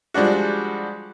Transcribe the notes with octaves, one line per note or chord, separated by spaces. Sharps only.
F3 G3 G#3 D4 F#4